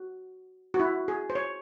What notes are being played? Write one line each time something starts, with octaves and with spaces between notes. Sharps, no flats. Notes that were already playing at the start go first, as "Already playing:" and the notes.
Already playing: F#4
F#4
E4
G#4
C5
C#5